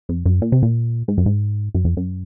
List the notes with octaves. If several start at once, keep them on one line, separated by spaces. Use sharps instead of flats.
F2
F#2
A#2
C3
A#2
G#2
F#2
G#2
F#2
F2
F#2